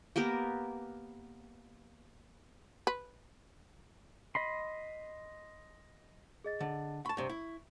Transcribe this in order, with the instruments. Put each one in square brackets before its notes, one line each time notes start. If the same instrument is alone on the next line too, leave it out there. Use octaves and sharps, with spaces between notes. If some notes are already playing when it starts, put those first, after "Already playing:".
[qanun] A#3 B3 G4 A#4
[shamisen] B4
[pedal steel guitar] D#5 B5 C6
[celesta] G#4 D#5 A6
[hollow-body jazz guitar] D3
[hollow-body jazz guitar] A5 B5 [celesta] C#6
[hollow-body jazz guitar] G2 C3
E4